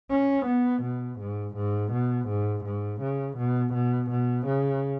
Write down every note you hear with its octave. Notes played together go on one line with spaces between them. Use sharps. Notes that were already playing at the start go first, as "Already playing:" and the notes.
C#4
B3
B2
G#2
G#2
B2
G#2
G#2
C#3
B2
B2
B2
C#3